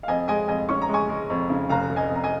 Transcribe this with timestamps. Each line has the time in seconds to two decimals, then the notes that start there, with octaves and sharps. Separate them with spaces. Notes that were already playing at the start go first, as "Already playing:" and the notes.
0.03 F5
0.08 F2 D#5 G#5
0.28 G#3 D#5 G#5
0.48 F2 D#5 G#5
0.69 C#4 C#6
0.82 A#5
0.89 G#3 G#5 C#6
1.09 G#3
1.30 F2
1.50 C#3
1.69 F1 F5 A#5
1.90 F1
1.96 D#5 G#5
2.10 F2 A#5
2.24 D#5 G#5